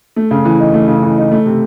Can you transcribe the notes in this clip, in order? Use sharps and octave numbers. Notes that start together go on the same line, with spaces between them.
A3
C#3
E3
D#4
A3
C#3
E3
D#4
A3
C3